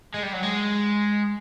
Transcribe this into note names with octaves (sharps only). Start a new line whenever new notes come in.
G#3
G3
F#3
G#3